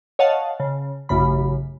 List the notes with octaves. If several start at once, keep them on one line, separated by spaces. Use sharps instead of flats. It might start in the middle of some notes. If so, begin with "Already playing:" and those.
C#5 D#5 F5 F#5 A5
C#3
A1 F#2 C#3 B5